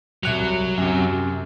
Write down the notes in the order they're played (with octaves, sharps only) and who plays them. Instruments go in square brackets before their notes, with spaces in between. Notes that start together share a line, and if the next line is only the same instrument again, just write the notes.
[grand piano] C2 F#6 F7 [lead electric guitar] F#3
[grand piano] F#2 C3